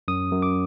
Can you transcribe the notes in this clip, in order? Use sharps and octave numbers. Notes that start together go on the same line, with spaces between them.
F#2 D#6
F#2
D6